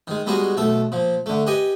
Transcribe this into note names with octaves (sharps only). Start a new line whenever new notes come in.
D#3 G#3
G3 G#3 B3 D#4 F#4 G#4
B1 A3 A4
A#2 F3
D3 A3
G4 B4 D#5 G#5